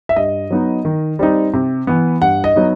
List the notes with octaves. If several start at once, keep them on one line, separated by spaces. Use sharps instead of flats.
E5
G2 D#5
F#3 B3 D#4
D#3
G3 C4 D#4
C3
E3 B3
G2 F#5
D#5
F#3 B3 D#4